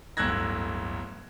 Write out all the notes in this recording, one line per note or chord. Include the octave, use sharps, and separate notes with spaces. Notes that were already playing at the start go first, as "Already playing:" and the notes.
D1 G1 E6 F#6 G#6 A#6